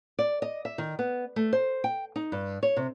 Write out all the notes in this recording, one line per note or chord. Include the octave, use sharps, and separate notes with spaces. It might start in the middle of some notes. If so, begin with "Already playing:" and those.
D5
D#5
E5
D#3
B3
A3
C5
G5
D#4
G2
C#5
C3